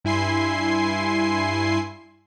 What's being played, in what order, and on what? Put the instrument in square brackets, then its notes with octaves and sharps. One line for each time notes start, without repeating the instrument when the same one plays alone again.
[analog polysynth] G2 E4 G#5 C6 C7